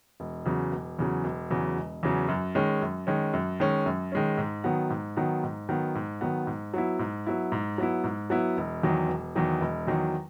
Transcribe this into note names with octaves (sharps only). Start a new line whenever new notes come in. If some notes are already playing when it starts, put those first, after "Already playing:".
E1
E2 C#3 F#3
E1
E2 C#3 F#3
E1
E2 C#3 F#3
E1
E2 C#3 F#3
F#2
D#3 G#3 C#4
F#2
D#3 G#3 C#4
F#2
D#3 G#3 C#4
F#2
D#3 G#3 C#4
G#2
D#3 F#3 B3
G#2
D#3 F#3 B3
G#2
D#3 F#3 B3
G#2
D#3 F#3 B3
G#2
F#3 B3 E4
G#2
F#3 B3 E4
G#2
F#3 B3 E4
G#2
F#3 B3 E4
E1
E2 D#3 F#3
E1
E2 D#3 F#3
E1
E2 D#3 F#3